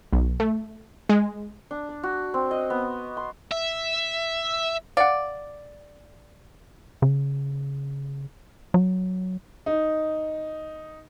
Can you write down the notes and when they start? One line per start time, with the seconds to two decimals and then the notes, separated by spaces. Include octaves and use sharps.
0.13 B1
0.40 A3
1.09 G#3
1.71 D4
1.89 D5
2.03 F#4
2.34 C4
2.51 D#5
2.70 B3
3.17 C6
3.51 E5
4.97 D5 F5 F#5
7.02 C#3
8.74 F#3
9.66 D#4